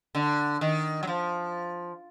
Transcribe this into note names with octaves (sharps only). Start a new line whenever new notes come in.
D3
D#3
F#3
F3